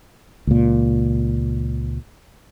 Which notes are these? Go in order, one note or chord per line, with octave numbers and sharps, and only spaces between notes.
C#2 A#2